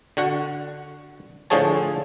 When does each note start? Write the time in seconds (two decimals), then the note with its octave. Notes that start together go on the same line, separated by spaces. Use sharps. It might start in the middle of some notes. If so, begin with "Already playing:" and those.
0.17 D3 F#4 F#5
1.50 A2 D3 F3 G#4 C#5 A5